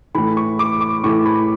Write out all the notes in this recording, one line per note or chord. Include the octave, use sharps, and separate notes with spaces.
A2 E3 B5
C#6
D6
D6
A2 E3 C#6
B5